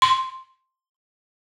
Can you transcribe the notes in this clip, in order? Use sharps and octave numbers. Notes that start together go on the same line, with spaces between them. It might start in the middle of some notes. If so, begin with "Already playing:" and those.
C6